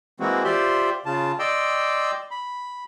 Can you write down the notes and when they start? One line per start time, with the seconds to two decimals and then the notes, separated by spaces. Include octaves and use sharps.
0.20 E3 G#3 A#3 C4 F#4
0.44 F4 G4 C5 D5 E5 C6
1.06 C#3 F4 A5
1.39 D5 D#5 G5 C6 D6 E6
2.31 B5